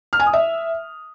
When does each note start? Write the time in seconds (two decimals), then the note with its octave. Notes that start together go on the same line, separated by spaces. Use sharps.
0.13 F6
0.20 G#5
0.26 D#6
0.33 E5